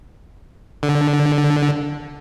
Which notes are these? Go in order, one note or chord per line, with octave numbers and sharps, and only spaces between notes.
D3